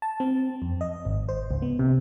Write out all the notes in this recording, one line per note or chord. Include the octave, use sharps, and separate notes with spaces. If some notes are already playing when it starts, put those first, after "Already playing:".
A5
C4
F2
D#5
G#1
C5
C#2
B3
C3